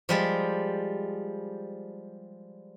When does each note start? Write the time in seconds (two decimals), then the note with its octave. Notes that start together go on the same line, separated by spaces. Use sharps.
0.09 F3 G3 G#3